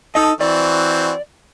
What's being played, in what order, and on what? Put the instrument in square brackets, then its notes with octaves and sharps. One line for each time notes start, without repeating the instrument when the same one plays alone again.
[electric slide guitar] D#4 D#5 [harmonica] A4 D#6
[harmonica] E3 C4 F#4 [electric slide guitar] D5